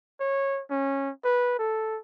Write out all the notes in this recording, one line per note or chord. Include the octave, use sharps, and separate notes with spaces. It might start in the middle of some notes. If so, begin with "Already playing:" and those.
C#5
C#4
B4
A4